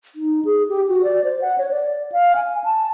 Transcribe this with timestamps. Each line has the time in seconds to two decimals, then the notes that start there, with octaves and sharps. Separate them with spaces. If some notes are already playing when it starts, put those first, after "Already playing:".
0.15 D#4
0.45 G#4
0.69 G4
0.88 F#4
1.03 D5
1.24 C5
1.41 F#5
1.58 C#5
1.71 D5
2.12 F5
2.36 G#5
2.64 A5